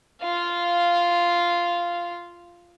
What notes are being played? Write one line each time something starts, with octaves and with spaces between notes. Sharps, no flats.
F4 F5